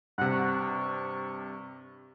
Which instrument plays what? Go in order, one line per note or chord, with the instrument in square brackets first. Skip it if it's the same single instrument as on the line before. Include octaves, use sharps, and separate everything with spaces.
[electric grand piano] G2 C3 [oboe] F#5
[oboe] C#6